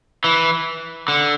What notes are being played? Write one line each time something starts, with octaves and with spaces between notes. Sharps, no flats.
E3
D3